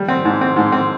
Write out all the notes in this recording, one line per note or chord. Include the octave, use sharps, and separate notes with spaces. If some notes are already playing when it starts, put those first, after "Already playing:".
Already playing: G3
C4
G#2
C4
G#2
C4